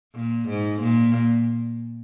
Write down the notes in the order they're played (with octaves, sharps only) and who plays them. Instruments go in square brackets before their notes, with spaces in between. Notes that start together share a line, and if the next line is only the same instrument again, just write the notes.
[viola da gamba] A#2
G#2
A#2